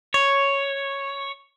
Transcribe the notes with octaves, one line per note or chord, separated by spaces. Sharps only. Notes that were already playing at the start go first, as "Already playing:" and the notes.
C#5